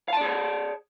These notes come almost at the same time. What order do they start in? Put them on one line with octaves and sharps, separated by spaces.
F5 A5 D5 G#4 C#5